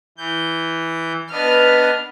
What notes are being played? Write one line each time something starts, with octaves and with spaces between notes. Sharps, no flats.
E3 G6
B3 D4 B4 D#5 F6